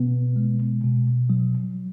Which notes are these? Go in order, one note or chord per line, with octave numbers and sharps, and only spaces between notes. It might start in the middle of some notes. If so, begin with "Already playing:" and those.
Already playing: B2 B3
G#3
B2
F#3